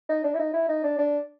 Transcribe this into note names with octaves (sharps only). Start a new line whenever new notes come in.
D#4
D4
E4
D#4
E4
D#4
D4
D4